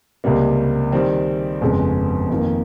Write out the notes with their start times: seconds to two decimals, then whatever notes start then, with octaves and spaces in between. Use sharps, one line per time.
0.24 C#2 C3 G3 A#3
0.92 D#3 G3 C4
1.61 G1 F2 C#3 G#3
2.29 F2 D#3 A#3